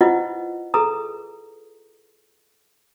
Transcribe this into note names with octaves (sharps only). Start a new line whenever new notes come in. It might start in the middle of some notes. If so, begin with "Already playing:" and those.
E4 F4 B4 C5 D#5 F#5
G#4 A4 B4 A#5 D#6